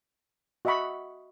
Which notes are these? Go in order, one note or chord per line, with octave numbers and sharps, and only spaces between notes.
F#4 D#5 E5 F#5 B5 C#6